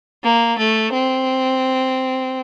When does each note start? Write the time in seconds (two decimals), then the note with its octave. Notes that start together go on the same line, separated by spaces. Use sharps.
0.23 A#3
0.58 A3
0.92 C4